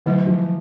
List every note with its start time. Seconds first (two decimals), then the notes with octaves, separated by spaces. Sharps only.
0.06 D3 E3 F#3 A3
0.27 F3